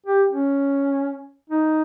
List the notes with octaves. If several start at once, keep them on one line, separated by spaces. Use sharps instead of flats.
G4
C#4
D#4